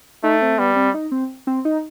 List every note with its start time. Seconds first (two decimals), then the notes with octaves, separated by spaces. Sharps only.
0.23 A3 D#4
0.42 C4
0.58 G3 B3
0.76 C4
0.94 D#4
1.12 C4
1.47 C4
1.65 D#4